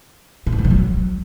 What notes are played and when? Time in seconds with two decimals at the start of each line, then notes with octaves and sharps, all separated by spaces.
0.47 A2
0.53 B2
0.59 G3
0.65 F3
0.71 F#3